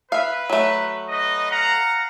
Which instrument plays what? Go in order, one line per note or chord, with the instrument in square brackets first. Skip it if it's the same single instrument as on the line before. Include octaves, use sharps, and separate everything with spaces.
[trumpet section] B4 [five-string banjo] E5 F5
[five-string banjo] F#3 A3
[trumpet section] D#4 B4 D#5
F5 F#5 A#5